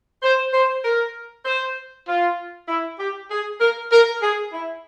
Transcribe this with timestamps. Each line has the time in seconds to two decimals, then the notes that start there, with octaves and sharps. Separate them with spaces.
0.23 C5
0.53 C5
0.84 A#4
1.45 C5
2.07 F4
2.68 E4
2.99 G4
3.30 G#4
3.60 A#4
3.91 A#4
4.21 G#4
4.52 E4